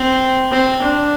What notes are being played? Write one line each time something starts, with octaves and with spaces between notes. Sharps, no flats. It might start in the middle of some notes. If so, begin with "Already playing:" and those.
Already playing: C4
C4
D4